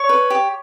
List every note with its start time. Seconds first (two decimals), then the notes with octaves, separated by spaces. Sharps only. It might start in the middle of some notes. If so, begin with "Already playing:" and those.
Already playing: C#5 C#6
0.09 B4
0.30 G4